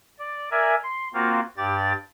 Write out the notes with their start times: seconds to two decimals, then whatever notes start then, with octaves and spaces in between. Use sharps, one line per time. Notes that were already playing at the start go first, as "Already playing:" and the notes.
0.19 D5
0.51 A#4 D5 E5 G#5
0.84 C6
1.14 A#3 C4 F4 F#4 F5
1.57 G2 G4 D5 A6